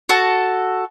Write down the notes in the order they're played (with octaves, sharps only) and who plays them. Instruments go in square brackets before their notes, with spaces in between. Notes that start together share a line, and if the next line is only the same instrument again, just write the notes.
[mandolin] F#4 A4 A5